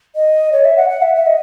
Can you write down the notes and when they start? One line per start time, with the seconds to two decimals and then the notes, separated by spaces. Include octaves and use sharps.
0.16 D#5
0.52 C#5
0.65 E5
0.77 F#5
0.89 F#5
1.02 E5
1.15 E5
1.26 D#5